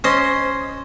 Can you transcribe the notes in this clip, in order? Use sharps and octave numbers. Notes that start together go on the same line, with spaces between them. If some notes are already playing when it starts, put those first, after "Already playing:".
C#4 C5 D#5